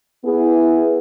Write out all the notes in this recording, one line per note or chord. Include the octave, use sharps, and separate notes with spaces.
B3 E4 G#4